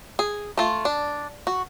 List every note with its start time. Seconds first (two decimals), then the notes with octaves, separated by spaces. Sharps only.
0.19 G#4
0.57 A3 F4
0.85 D4
1.47 F#4